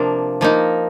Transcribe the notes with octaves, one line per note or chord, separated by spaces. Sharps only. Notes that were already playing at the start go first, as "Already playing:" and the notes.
Already playing: C3 F3 A#3 D4
F3 A#3 D#4